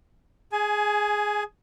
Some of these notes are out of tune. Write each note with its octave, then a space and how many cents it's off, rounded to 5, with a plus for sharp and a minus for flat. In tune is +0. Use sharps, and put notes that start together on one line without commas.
G#4 +0 G#5 +25